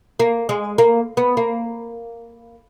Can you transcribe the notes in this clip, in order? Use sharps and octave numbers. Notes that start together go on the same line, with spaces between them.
A#3
G#3
A#3
B3
A#3